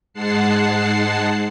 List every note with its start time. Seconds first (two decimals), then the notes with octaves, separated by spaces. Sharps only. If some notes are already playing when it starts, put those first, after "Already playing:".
0.14 G#2 G#3 F#5 A5 C7